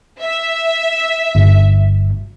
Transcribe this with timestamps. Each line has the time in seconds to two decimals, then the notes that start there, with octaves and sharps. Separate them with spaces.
0.22 E5
1.35 G1